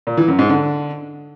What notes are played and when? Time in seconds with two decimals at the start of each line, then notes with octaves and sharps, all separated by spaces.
0.07 A#2
0.17 E3
0.28 F#2
0.39 G#2
0.49 D3